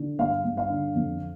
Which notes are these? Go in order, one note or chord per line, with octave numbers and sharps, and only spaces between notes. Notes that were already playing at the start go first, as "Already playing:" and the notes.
Already playing: D3
G2 F5
G2
F5
D3
F2